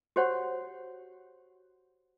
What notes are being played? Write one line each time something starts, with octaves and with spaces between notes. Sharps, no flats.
F#4 G4 C5 C#5 F#5